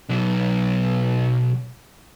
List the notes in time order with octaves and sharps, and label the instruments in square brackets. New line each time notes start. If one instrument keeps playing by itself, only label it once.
[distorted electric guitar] B1 F#3